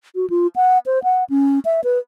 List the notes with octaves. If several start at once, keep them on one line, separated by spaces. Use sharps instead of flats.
F#4
F4
F#5
C5
F#5
C#4
E5
B4